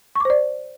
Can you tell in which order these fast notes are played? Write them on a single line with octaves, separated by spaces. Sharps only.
C#6 D6 C5 D5